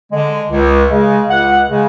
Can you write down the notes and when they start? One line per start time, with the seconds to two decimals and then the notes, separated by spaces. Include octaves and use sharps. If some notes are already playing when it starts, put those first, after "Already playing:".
0.11 D3 G#3
0.50 C#2
0.88 C#3 G#3
1.28 C#2 F#5
1.67 C#3 G#3